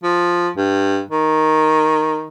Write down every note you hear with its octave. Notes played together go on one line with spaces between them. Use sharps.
F3
G2
D#3